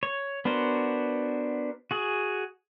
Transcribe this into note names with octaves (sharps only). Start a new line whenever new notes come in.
C#5
B3 D4 F#4 A#4 C5
F#4 G#4